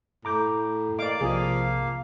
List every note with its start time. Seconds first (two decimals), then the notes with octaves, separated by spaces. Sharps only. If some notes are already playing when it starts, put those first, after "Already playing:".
0.25 A2 A#5 D6 G6
0.99 A#3 D5 D#5 F5 D6
1.21 B1 C3 F3 G#4